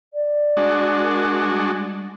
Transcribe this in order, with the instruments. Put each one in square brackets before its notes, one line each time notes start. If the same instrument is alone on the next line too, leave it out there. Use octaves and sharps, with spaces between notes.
[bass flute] D5
[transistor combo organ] G#3 D4 F#4
[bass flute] A#4
G3